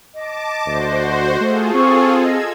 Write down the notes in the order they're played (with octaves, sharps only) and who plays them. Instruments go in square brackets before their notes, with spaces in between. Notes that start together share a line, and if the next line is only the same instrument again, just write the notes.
[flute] D#5 [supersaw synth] A5 D6
[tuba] D2 [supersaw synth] F#4 C5
[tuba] A3 [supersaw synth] F4 G#4 A4
[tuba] C4 [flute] C#6
[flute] D#5 [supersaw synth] E6 G#6